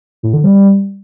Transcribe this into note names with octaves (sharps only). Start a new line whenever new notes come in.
A2
D3
G3